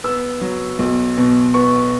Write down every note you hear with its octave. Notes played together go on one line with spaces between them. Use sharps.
B3 E6
F#3
B1
B2
B3 C#6